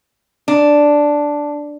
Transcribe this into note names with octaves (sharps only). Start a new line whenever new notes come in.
D4